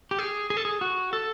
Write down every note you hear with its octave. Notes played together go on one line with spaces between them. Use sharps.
G4
G#4
G#4
A4
G#4
F#4
A4